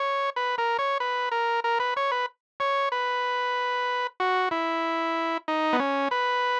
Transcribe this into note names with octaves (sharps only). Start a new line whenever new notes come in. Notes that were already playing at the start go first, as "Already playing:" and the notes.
Already playing: C#5
B4
A#4
C#5
B4
A#4
A#4
B4
C#5
B4
C#5
B4
F#4
E4
D#4
B3
C#4
B4